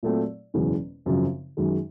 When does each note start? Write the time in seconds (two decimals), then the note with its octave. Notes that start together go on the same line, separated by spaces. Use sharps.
0.03 A#2 F#3 A3 C4
0.54 F#1 E2 B2 G#3 C#4
1.06 G#1 F#2 C#3 F3
1.57 F#2 D#3 G#3